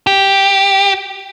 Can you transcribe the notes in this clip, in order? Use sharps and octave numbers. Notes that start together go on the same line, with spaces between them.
G4